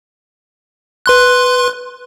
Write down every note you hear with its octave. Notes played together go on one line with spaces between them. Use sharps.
B4 C6 F#6